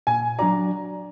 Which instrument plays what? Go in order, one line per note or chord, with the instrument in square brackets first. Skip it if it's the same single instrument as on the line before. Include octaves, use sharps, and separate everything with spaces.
[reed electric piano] A#2 [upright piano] G#5
[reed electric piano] F#3 D4 F#4 D5 [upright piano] A#5